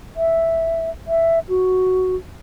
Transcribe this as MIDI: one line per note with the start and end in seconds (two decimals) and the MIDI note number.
0.17 0.90 76
1.07 1.39 76
1.49 2.15 66